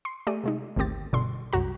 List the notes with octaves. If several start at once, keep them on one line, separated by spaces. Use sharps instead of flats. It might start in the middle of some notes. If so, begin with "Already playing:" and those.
C6 C7
A3 G4 G#4 D5 D#7
C3 G#3 D#4
G#1 D2 D#3 C4 G4 A6
G1 B2 D4 A4 C6
C2 F#2 F#4 A#5